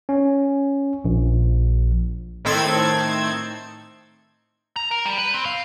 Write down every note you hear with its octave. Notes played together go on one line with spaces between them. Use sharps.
C#4
A#1
A2 D#3 C4 A4 G#6
A#5
A#4
G3
B4
C4
F5